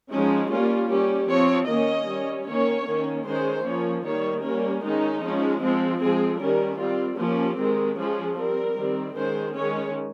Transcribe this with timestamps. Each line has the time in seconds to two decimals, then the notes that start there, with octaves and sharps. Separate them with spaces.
0.12 F3 G#3 C#4 D#4
0.50 G3 A#3 C#4 F4
0.90 G3 C#4 G4
1.29 F3 C4 C#5
1.68 D#3 A#3 C#4 D#5
2.08 G3 C#4
2.47 D#3 A#3 C#4 C#5
2.86 D#3 A#3 C#4
3.25 D#3 G#3 C#4 C5
3.65 F3 A#3 C#4 C#5
4.04 D#3 G3 A#3 C#5
4.43 G3 A#3 C#4 A#4
4.83 D#3 G#3 C#4 D#4
5.22 F3 G#3 C#4
5.61 F3 G#3 C4
6.00 F3 G#3 C4 G#4
6.40 D#3 G3 C#4 A#4
6.80 G3 C4 F4
7.18 F3 A#3 C#4 G4
7.58 D#3 G#3 C4
7.97 F3 G#3 C#4 G#4
8.36 G3 C4 A#4
8.76 D#3 G3 C4
9.15 D#3 G#3 C#4 C5
9.54 D#3 G#3 C#4 C#5